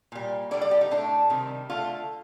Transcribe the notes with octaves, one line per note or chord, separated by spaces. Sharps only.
A#2 G3
D3 G3 D5
D5
G4
D#4
A2 A3 D4
C3 D#3 G3
D3 A3 F4